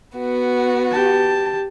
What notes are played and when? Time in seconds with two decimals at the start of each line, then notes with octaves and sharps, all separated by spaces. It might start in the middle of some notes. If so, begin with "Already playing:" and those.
0.18 B3 F#4
0.92 G4 A5